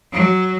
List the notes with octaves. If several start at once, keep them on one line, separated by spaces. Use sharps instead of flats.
F#3